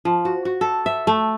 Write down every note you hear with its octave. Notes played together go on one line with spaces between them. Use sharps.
F3
F#4
F#4
A4
E5
A3